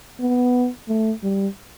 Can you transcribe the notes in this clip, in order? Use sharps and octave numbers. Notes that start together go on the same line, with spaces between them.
B3
A3
G3